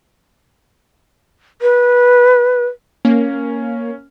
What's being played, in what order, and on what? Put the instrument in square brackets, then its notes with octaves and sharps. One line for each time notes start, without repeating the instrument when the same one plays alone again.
[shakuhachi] B4
[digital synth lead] A#3 [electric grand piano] C#4